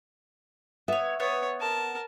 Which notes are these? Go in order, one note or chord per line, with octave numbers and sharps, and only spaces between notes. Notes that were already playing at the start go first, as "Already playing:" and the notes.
B3 C#5 E5
B3 C#5
A#4 A5